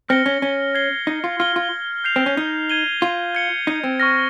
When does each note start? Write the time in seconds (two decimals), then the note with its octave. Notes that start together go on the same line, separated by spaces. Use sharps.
0.09 C4 F6 A#6 C#7 G7
0.26 C#4
0.42 C#4
0.75 G#6 C7 G7
1.07 D#4
1.24 F4
1.40 F4 F6 C7 G7
1.56 F4
2.04 G6 C7 F7
2.16 C4
2.26 C#4
2.37 D#4
2.70 G#6 D#7 G7
3.02 F4
3.35 G#6 C#7 G7
3.67 D#4
3.84 C4
4.00 C#6 F6 A#6